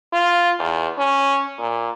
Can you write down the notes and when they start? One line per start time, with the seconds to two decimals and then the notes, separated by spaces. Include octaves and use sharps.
0.13 F4
0.59 E2
0.98 C#4
1.59 A#2